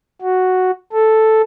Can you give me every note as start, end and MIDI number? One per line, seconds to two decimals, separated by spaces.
0.21 0.71 66
0.92 1.41 69